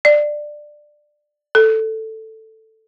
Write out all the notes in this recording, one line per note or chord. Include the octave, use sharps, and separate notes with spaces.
D5
A4